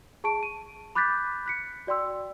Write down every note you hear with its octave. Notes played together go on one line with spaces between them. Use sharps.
G#4 A5 C#6 D7
D#7
B5 D6 F#6 G6 A6 B6
F#6 B6 C#7
F#4 D5 G5 C6 E6